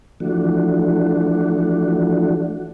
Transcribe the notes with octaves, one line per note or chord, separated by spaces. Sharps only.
E3 F3 A3 D4 F#4